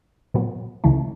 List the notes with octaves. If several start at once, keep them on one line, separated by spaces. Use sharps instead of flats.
A#2 F#3 B3
C#2 C#3 E3 A3